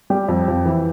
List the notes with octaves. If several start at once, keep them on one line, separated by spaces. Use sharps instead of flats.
G3 G4
F2
F2
E3